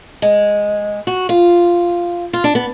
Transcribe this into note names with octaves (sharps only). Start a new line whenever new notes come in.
G#3
F#4
F4
F4
D4
B3